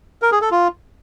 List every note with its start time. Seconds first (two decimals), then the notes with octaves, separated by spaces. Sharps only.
0.22 A#4
0.32 G#4
0.42 A4
0.51 F4